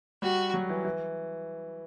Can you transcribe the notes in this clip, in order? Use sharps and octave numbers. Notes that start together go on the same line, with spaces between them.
G3 F#4
F#3
E3
E3